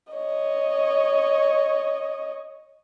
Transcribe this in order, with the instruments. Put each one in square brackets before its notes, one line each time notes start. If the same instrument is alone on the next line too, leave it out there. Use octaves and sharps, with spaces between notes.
[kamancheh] C#5 D#5